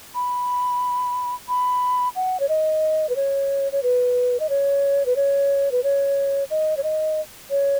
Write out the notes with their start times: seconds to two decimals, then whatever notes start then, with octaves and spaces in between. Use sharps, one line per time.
0.15 B5
1.48 B5
2.16 F#5
2.40 C#5
2.49 D#5
3.09 B4
3.16 C#5
3.72 C#5
3.83 B4
4.40 D#5
4.50 C#5
5.06 B4
5.16 C#5
5.72 B4
5.84 C#5
6.50 D#5
6.77 C#5
6.83 D#5
7.50 C#5